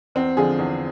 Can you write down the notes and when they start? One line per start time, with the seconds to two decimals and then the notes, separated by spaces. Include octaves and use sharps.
0.15 E2 C4
0.37 D3 F3 G#4
0.59 E2